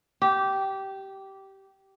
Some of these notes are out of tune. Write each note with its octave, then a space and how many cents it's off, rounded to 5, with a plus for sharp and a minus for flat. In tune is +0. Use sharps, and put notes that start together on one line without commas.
G4 -15